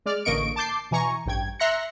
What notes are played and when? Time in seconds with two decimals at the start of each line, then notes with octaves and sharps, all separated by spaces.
0.06 G#3 D5 F6
0.25 A1 D3 A#3 D#5 C#6 D7
0.56 A5 D6 G6 C7
0.91 B2 E3 G#5 A#5 C#6
1.26 A1 G2 G5 G#6
1.59 E5 A#5 C6 F#6 A#6 C#7